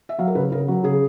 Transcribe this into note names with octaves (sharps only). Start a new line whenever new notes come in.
E5
F#3 F5
A#4
C#3 B4
C#3 A#4
F#3
C#3 G#4